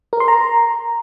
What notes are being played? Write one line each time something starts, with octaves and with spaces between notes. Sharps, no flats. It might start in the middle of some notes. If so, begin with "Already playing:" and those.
A#4
C6
A#5